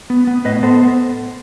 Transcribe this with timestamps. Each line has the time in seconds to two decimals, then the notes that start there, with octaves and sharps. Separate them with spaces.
0.10 B3
0.27 B3
0.45 A2 B4 D#5
0.63 B3 A4 C5